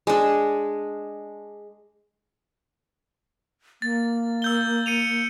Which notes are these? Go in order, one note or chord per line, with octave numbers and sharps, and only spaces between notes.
G#3 D4
A#3 A6
E6 G6 G7
C#7 D#7 F7